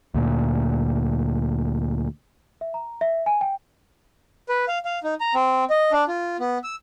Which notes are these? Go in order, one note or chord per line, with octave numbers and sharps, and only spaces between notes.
D2 A#2
E5
A#5
E5
G#5
G5
B4
F5
F5
D#4
A#5
C4
D#5
D4
F4
B3
E6